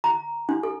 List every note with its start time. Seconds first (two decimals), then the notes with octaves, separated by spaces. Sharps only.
0.04 A#5
0.49 D4
0.63 A4